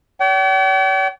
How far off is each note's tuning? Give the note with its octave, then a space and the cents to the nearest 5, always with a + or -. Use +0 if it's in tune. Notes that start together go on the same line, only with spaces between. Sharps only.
C#5 +45 G5 -45